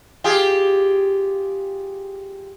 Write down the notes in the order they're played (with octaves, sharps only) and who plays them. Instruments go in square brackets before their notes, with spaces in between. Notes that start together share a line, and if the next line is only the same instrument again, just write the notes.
[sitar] F4 G4 G#4